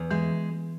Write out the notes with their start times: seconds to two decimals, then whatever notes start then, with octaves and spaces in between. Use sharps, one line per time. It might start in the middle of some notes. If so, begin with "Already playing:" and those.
Already playing: E2
0.11 E3 G#3